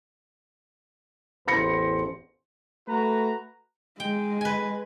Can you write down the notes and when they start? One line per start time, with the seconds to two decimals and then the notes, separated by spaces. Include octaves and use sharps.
1.48 A1 E2 C5 B5 A#6 C#7
2.88 A3 F#4 B4 A#5
4.00 G#3 G5
4.41 B4 G#5